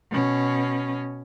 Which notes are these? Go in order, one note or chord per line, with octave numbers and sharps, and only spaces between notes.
B2 C#4